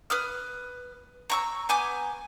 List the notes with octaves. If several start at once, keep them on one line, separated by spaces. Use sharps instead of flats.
B4 D#6 F6
A#5 C#6 E6
B3 G#5 D6 G6